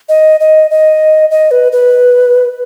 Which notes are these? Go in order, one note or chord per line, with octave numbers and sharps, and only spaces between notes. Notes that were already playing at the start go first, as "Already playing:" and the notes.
D#5
D#5
D#5
D#5
B4
B4